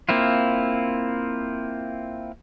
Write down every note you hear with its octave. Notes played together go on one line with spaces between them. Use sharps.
A#3 C4 E4 F4